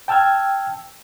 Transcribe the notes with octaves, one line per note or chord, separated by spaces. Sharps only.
G5 A5 E6 F6 G#6